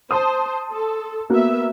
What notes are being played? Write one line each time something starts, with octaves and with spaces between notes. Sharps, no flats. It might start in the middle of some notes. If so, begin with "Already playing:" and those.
C5 A5 C6 D#6
A4
A#3 B3 F#4 E5